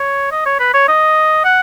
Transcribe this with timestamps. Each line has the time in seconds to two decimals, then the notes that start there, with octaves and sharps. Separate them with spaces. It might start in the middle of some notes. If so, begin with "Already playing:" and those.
Already playing: C#5
0.31 D#5
0.45 C#5
0.59 B4
0.74 C#5
0.88 D#5
1.44 F#5